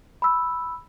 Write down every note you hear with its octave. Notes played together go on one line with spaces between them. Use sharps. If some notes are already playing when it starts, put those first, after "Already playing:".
B5 E6